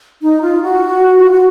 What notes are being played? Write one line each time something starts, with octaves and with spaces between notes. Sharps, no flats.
D#4
F4
F#4
F4
F#4